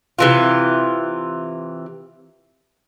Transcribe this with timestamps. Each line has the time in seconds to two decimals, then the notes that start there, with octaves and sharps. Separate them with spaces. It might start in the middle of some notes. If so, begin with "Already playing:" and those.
0.19 C3 E3 F4